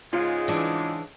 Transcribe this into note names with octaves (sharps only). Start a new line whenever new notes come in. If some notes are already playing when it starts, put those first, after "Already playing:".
G#2 C#3 G#3 F4
E3 D4